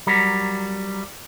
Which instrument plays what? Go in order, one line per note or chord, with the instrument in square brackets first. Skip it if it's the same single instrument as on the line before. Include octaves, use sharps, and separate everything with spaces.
[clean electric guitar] F#3 G3 A#4